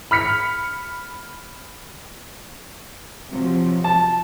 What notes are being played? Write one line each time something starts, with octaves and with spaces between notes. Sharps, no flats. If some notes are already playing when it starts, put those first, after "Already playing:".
B5 F6 B6 C#7
C3 F3 F#3
A5